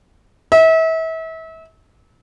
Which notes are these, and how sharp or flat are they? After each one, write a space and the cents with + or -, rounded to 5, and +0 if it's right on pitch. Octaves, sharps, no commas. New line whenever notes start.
E5 -35